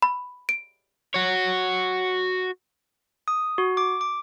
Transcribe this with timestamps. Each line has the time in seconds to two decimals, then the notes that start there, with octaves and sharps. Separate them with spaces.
0.02 B5
0.49 D7
1.14 F#4 C#5
3.28 D#6
3.58 F#4
3.77 D6
4.01 D6